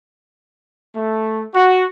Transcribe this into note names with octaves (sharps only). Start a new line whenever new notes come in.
A3
F#4